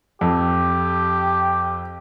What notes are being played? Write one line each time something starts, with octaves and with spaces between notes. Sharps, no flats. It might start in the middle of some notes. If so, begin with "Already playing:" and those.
F2 G4